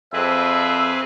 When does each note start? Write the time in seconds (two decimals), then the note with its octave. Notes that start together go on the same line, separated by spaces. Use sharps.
0.13 F2 C4 G#4 B4 E5